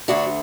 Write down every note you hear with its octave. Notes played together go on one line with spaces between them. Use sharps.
D2 D3 D4 F#4